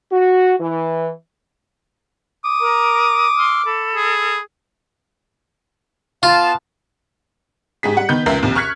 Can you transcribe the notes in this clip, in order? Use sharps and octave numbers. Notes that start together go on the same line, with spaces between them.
F#4
E3
D6 D#6
A#4 A#5
C6 E6 F6
A4 B5
G#4
B3 F4 F5 A5
G#2 G4 G#4 B6
G3 F#5
D#3 B3 B4 G6
F1 C#2 A#4 E5 C7
A#1 D#2 C3
C#6 F6 F#6 G#6 B6 C#7